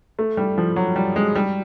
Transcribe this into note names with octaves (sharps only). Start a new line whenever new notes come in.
A3
G3
F3
F#3
G3
G#3
G3